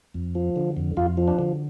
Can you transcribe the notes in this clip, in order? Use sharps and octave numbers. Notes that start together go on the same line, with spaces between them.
F2
F3
D3
F2
F2 F4
F3
D4
D3